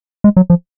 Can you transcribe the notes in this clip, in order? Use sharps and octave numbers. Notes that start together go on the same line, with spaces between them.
G#3
F#3
F3